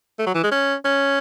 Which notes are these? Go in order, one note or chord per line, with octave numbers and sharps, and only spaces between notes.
A3
F#3
E3
G#3
C#4
C#4